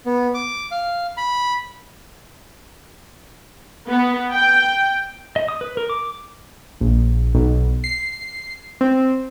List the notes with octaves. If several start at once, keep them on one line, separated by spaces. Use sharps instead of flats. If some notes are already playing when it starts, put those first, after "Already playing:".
B3
D6
F5
B5
B3
G5
D#5
D#6
B4
A#4
D6
A#1
B1
C7
C4